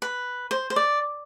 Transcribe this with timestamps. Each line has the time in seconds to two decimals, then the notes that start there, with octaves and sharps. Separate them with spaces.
0.02 B4
0.51 C5
0.70 C5
0.76 D5